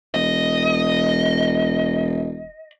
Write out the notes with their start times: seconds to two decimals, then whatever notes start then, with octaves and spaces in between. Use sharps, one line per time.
0.14 E1 D#5